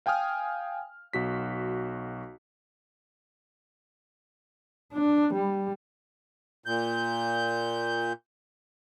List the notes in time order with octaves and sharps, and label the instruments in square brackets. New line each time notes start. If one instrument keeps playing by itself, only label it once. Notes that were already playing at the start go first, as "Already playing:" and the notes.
[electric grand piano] F5 G5 G#5 D#6 F6
B1 F#4 B6
[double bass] D4
G3
[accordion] A#2 G6